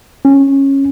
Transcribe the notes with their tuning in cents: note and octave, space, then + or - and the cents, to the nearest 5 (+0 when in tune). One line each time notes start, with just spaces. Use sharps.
C#4 -15